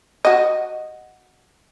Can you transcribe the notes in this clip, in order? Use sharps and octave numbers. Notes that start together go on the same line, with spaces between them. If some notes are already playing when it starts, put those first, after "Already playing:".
F#4 D#5